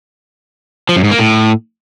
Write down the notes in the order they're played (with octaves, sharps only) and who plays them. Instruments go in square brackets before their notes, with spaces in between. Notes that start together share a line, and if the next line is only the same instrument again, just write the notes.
[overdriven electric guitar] F3
F#2
G#2
A#3
A2